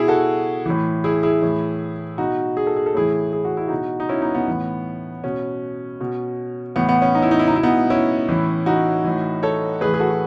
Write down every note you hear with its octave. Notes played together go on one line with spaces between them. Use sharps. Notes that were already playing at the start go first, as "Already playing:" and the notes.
Already playing: B2 E4 G#4
F#4 A4
A2 E3
E4 G#4
E4 G#4
A2 E3
B2 D#4 F#4
G#4
A4
G#4
A4
A2 E3 E4 G#4
G#4
F#4
E4
B2 D#4 F#4
D#4
C#4 E4
B3 D#4
B3
A2 E3
B2 C#4
B2
A2 E3 B3
B3
C#4
D#4
E4
D#4
E4
D#4
B2 E4
B3 D#4
C#4 E4
A2 E3
D#4 F#4
A2 E3
A4 C#5
A2 E3 G#4 B4
G#4
F#4 A4
F#4